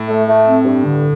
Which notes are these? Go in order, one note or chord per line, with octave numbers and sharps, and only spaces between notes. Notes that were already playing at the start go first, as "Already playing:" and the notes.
Already playing: A2
A3
A3
C4
G2
D3